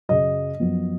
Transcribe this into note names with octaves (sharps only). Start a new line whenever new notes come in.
F#2 C#3 F#3 D#5
F#2 F3 B3